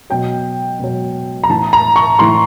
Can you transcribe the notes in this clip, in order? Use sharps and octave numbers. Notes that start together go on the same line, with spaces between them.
B2 F#3 G5
B2 F#3
A#5
A2 E3 A5
A#5
C#6
A2 E3 C6